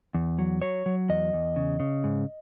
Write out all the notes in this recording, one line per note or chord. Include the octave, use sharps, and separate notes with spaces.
E2
F#3
F#3 C#5
F#3
E2 D#5
E2
C#3
C#3
G#2